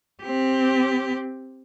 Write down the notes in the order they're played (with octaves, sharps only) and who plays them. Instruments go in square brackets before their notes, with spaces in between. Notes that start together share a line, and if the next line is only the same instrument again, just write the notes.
[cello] C4 G4